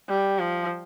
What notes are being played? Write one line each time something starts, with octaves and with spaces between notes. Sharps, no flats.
G3
F3